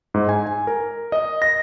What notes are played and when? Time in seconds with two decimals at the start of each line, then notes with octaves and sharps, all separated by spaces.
0.14 G#2
0.29 G#5
0.46 G#5
0.67 A#4
1.12 D#5
1.42 A#6